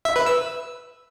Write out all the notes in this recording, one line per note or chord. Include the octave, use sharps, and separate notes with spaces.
E5
B4
E6